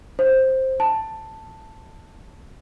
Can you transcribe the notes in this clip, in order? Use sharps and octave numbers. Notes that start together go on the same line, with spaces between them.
C5
A5